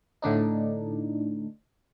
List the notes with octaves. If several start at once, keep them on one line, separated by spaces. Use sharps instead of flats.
A2 D3 D4 D#4